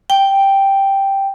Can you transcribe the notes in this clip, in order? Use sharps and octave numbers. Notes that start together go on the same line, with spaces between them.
G5